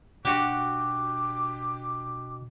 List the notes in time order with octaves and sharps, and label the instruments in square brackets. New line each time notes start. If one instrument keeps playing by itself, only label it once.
[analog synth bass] B2 [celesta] D4 G5 F#6 [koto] F#4 G4 [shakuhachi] D6